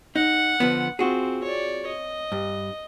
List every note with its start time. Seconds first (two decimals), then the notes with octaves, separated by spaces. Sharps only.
0.16 D#4 F#5
0.60 D3 F3 B3
0.99 C4 F4 F#4 G#4
1.44 C#5 D5
1.87 D#5
2.32 G2